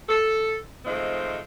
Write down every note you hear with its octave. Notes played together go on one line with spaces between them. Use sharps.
A4
D#3 F3 G#3 A3 C4